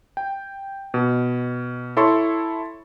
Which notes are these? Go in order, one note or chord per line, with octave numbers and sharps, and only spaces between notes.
G5
B2
E4 A4 C#5 C6 C#6